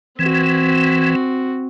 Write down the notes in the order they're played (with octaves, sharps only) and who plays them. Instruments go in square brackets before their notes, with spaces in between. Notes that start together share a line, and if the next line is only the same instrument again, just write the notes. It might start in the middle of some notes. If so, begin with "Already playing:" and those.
[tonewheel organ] E3 [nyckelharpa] C4 F#4